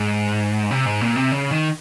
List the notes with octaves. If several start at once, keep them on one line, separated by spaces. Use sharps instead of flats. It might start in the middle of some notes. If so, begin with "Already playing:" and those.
Already playing: G#2
C3
G#2
A#2
C3
C#3
D#3